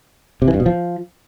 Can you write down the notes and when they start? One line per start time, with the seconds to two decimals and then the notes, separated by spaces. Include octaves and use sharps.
0.42 C3
0.48 E3
0.54 G2
0.60 B2
0.66 F3